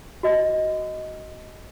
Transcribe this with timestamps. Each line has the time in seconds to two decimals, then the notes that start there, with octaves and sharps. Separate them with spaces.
0.23 F#4 D#5